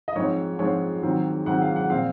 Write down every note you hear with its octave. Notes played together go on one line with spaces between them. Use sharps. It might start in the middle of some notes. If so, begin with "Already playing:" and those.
D#5
G#2 F3 G#3 C4 C#5
G#2 F3 G#3 C4 C#5
G#2 D#3 F#3 C4
G#2 D#3 F#3 C4 F#5
F5
F#5
A#2 F3 C4 F5